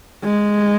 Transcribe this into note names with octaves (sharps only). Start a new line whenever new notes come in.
G#3